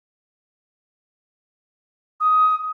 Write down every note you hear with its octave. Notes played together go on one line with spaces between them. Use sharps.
D#6